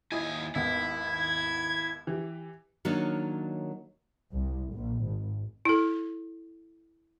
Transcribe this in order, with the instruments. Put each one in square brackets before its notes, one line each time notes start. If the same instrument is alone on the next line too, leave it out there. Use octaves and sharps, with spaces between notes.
[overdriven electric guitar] D#2 G#5 [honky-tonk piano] E4 D#5
[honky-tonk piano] G#1 D#2 B3 [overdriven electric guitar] E4
[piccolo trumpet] G#6
[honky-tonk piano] E3 G4
[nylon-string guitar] D#3 F#3 A#3 D4 C#5 D#5
[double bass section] C2
A#1
G#1
[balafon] E4 A4